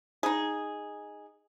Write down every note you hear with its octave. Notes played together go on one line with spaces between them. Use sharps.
D#4 G#4